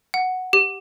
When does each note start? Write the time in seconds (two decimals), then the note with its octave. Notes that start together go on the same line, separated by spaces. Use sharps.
0.14 F#5
0.53 G4